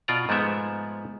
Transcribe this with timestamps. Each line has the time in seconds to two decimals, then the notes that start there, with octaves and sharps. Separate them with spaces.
0.08 B2 F4 D5 A#5
0.29 G#2 F3 G#3 A3 B3 E5